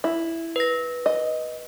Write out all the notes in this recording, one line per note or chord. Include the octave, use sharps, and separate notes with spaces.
E4
B4 A#6
D#5